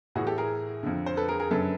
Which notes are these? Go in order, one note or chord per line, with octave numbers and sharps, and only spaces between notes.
A2 E3 F#4 G#4
G4 A4
G#4 A#4
F2 D3
C5
A4 B4
G#4 A#4
G#4 A#4
F#2 D3 A4 B4